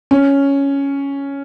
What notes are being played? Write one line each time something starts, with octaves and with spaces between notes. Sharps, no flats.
C#4